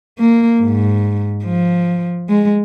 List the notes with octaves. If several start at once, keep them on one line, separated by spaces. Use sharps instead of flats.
A#3
G#2
F3
G#3